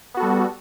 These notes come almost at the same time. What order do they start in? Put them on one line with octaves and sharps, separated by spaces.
B3 F#4 A4 G3